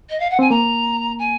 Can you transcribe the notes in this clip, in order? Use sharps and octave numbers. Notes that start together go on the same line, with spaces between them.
D#5
F5
F#5
C4 G#5
A#3 A#5
G#5